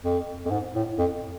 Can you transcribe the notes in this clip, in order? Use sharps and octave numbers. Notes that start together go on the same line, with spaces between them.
F2
F2
G#2
A2
F2